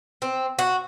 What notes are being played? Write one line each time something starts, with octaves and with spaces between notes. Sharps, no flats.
C4
F#4